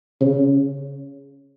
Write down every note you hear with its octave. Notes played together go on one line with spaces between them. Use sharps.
C#3